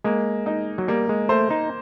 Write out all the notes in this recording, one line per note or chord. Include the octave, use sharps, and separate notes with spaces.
G#3 A#3
D#4
F#3
G3 A#3
G#3
A3 C5
D#4